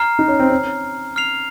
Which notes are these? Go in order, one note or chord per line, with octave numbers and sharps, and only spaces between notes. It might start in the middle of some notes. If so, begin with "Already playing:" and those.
Already playing: A#5 F6 C7
D#4
C#4
C4
C#4
F6 C7 F7